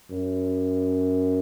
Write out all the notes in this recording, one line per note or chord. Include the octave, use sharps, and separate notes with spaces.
F#2